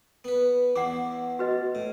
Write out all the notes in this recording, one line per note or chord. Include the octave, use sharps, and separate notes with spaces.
B3 B4
E2 E4 F#5 D6
F#4 B4 D#5
A2